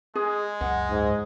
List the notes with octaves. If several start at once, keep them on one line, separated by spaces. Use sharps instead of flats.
G#3 G#4
C#2 F#2 F#5
G#2